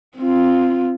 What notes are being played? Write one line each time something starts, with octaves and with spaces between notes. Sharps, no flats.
C4 F4